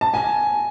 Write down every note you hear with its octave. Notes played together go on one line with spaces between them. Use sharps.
A5
G#5